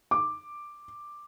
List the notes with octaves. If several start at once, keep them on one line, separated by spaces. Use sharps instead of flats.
D6